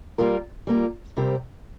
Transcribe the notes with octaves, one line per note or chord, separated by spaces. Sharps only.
G3 A#3 F4 A#4
G3 A#3 F4 A#4
C3 G3 C4 G4 A#4